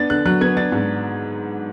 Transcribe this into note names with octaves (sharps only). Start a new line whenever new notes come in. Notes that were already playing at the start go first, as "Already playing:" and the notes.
Already playing: B3 D4 A6
D3 F#6
F#3 F#6
B3 G#6
D4 A6
G#2